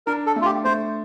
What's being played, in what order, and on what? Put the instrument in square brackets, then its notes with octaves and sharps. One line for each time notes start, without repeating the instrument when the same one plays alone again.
[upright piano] D4 [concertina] A#4
[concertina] A4
[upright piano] A3
[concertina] F4
G4
[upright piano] A3 [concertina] C5